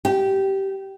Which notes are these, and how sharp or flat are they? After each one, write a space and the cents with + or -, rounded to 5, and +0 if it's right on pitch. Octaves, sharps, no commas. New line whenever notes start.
G4 -15